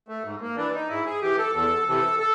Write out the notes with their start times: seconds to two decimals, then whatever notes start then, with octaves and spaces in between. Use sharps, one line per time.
0.08 A3
0.24 G#2
0.41 A#3
0.57 E3 D4
0.74 D#4
0.89 G#2 E4
1.05 G#4
1.22 E3 G4
1.38 A4
1.54 E2 A4
1.88 C3 E3 A4
2.20 A4